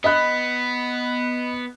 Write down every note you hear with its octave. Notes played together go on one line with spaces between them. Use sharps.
B3 D#5 B5 F#6